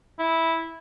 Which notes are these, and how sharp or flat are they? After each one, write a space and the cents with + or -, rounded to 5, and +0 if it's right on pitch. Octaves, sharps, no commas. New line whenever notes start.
E4 -10